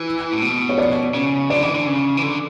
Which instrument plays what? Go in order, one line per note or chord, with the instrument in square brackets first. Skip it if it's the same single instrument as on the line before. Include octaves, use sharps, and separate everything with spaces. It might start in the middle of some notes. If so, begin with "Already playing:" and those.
Already playing: [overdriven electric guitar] E3
A2
B2
[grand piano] C#5
D5
[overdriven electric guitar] C#3
[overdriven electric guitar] D3 [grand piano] D5
[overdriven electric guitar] E3
D3
C#3
E3
D3